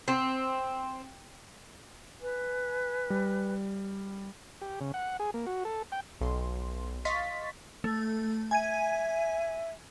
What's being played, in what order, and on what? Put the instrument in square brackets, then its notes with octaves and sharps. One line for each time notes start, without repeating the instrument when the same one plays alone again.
[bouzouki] C4
[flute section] B4 G#5
[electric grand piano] G3
[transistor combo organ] G4
C#3
F#5
G#4
A#3
F#4
A4
G5
[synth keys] B1 C6
D#5 F5 C6 C#6 A6 B6
[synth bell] A3
[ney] E5 [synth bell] G#5 G#6 D#7